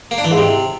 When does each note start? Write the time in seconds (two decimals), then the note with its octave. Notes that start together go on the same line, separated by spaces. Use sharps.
0.11 A#3
0.18 D4
0.25 E3
0.31 G#2
0.38 C3